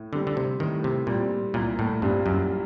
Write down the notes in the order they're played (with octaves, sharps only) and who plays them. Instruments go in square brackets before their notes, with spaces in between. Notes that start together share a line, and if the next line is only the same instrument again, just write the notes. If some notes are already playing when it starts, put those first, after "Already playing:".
Already playing: [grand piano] A2
[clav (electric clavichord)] D3 [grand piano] G3 C4
[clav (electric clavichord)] D3
C3
[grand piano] A2 [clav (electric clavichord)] D#3
[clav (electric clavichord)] C3
[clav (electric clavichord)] A#2 [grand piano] G3 C4
[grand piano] C2 [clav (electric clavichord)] A#2
[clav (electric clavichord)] A2
[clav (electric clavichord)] G2 [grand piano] A#2 G3 C4
[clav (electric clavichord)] F#2